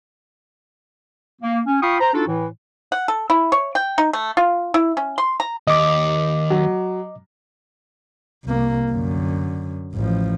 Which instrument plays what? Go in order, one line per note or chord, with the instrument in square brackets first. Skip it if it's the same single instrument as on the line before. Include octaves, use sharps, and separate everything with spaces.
[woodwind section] A#3
C#4
F4 F5 G5 B5 C#6 D#6
C5 A#5
D4 D#4 F4 F#4 A4
A2 E3
[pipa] F#5
A4
E4
C#5
G5
D#4
A3
F4
E4
C#4
C6
A#5
[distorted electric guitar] D#2 [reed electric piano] D#5 D6
[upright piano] F#3
[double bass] C2 A#3
F#2 D3
A1 F3